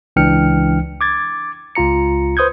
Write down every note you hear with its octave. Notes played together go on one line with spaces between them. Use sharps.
C#2 E3 D4 G5 F6 C#7
D6 G#6 A6
C#2 F4 A#5 C#7
B4 C5 D#6 G6 G#6